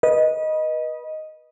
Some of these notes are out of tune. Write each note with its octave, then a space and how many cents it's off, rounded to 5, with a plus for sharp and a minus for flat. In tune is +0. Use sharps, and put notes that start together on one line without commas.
B4 -25 D#5 +0